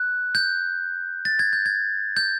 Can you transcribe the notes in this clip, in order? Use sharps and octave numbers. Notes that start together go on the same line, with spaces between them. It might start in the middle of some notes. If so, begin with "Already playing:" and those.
Already playing: F#6
G6
A6
G#6
G6
G#6
G6